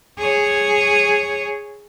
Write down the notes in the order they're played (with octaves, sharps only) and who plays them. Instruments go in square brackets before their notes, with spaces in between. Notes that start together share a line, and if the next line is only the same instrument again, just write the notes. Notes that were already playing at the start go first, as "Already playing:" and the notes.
[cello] G#4 C#5